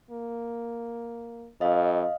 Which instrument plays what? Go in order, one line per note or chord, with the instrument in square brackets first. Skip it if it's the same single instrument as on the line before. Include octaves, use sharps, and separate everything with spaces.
[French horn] A#3
[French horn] F2 [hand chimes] D#5 F5